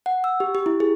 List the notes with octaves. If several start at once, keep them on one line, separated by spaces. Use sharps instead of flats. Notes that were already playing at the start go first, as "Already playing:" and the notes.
F#5
E6
G4
G4
E4
G#4